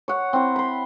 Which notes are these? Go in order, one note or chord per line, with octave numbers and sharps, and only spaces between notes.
C#5 F#5
C4 E4
B5 C6